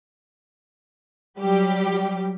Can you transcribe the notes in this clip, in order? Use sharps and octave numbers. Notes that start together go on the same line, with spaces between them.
F#3 G3 G4